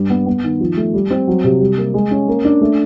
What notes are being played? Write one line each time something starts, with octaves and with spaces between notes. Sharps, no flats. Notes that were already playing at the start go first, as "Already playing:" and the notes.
Already playing: G2 G3
B3
B3
D#3
F3
A3
G3
C4
F#3
C3
G3
A#3
G#3
C#4
A#3
D4
A3